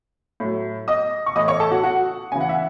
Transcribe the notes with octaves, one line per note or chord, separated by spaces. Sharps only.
A2 F#3
D#5 D#6
C#6
A2 E3 D#5 D#6
C#5 C#6
A4 A5
F#4 F#5
F#4 F#5
C#3 E3 G#5
F#5
E5